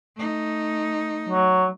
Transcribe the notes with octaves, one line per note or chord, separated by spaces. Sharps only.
A3 D#4
F#3